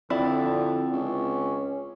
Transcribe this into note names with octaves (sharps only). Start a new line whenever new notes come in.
F2 D3 C4 E4 D5 G5 A6
C#2 C#4